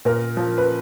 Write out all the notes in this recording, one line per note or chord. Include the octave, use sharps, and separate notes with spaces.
A#2 A#4
F3
B4